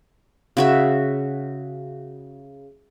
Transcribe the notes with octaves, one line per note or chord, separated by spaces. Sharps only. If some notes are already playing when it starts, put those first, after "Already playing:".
C#3 F#4 E5